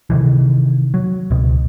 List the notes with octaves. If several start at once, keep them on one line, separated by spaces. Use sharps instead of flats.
C3 D#3 E3
F#3
C#2 B2